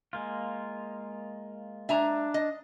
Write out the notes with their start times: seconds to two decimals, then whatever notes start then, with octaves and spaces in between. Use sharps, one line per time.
0.13 G#3 A#3 F4
1.89 D4 E5 G#5 A#5
2.34 D#5